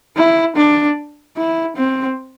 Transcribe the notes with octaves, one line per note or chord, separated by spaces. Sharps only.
E4
D4
E4
C4